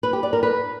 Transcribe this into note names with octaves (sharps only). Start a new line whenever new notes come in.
B4
G4
D5
A#4
B4